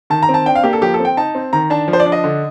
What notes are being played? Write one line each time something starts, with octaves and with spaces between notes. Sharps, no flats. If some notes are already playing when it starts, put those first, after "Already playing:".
D#3 A5
A#5
C4
A5
D4 G5
F5
A#3 G4
A4
F3 G4
A4
C4
G5
D#4 A5
C4
D#3 A#5
D4 A5
F3
C5
D5
D4
D#5
D3